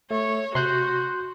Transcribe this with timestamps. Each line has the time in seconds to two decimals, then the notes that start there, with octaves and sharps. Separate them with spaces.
0.11 A3 C#5
0.55 C3 F#4 C6 F#6 G6